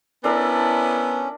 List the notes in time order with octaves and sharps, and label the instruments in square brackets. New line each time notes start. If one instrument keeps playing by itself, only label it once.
[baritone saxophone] B3 [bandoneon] C#4 [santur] D4 A4 A#4 [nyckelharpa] E4